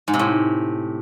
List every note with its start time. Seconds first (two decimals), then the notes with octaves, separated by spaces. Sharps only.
0.08 G#2
0.14 C3
0.19 A2